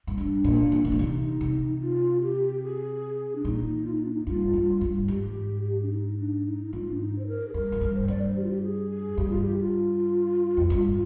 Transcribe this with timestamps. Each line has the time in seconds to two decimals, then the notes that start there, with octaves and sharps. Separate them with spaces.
0.07 G#2
0.18 G2 D4
0.44 A#2
0.72 A#2
0.85 G#2 D4
0.92 A#2
0.99 C3 D#4
1.41 C3
1.81 F4
2.22 G4
2.63 G#4
3.35 D4
3.45 A#2 D#4
3.85 F4
3.94 D#4
4.04 D4
4.12 D#4
4.27 G2 F4
4.53 G2
4.81 G2
5.08 G#2 G4
5.83 D4
5.90 D#4
6.18 D4
6.45 D#4
6.63 D#4
6.72 G#2 F4
6.90 D4
7.00 D#4
7.18 C5
7.27 A#4
7.48 G#4
7.54 G2 A#4
7.72 G#2
7.81 G2
7.95 C5
8.08 G2 D5
8.22 C5
8.36 G4
8.44 F4
8.51 G4
8.63 G#4
8.90 G#4
9.18 G2 G4
9.30 F4
9.41 G4
9.58 F4
10.57 F2
10.70 G2